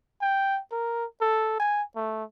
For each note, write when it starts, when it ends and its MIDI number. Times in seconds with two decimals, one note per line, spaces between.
0.21 0.60 79
0.72 1.05 70
1.21 1.55 69
1.60 1.82 80
1.96 2.24 57